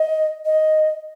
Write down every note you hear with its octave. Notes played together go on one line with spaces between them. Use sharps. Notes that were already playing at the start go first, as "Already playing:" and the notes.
Already playing: D#5
D#5